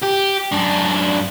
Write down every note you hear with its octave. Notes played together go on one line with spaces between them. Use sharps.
G4
F#2 D4